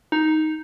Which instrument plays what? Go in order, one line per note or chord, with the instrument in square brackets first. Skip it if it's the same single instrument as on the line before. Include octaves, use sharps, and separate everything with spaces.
[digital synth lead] D#4